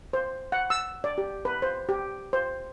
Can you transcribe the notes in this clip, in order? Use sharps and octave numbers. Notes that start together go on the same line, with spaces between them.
C5
F#5
E6
D5
G4
B4
C5
G4
C5